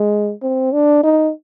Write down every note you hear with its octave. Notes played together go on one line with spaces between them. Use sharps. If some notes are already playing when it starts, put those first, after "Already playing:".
Already playing: G#3
C4
D4
D#4